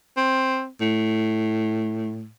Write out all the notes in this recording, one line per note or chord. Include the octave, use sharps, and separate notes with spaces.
C4
A2